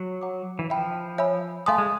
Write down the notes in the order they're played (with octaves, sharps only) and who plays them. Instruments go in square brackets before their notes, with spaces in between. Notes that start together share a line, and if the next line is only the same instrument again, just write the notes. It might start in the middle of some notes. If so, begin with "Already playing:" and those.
Already playing: [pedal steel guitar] F#3
[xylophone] C#5 F#5 A#5 D6
[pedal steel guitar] E3
[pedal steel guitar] F3 [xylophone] E5 G5 B5
[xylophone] C#5 E5 G#5 B5 E6
[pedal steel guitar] A3 [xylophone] F5 G#5 C6 D#6
[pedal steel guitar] G#3